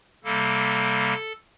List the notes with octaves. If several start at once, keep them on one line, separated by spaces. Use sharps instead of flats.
C3 G3 A#3 A4